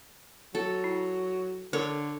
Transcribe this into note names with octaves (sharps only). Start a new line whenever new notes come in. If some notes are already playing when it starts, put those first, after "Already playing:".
F#3 A4
E4
D3 A4 A#4 C#5